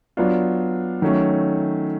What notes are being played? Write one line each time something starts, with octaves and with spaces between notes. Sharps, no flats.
F#3 B3 D4 F4
D#3 F#3 A3 C#4